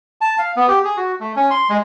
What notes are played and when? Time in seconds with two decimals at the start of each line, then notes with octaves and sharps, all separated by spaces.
0.21 A5
0.39 F5
0.56 B3
0.68 G4
0.85 G#4
0.97 F#4
1.20 A3
1.36 C#4
1.51 C6
1.70 G#3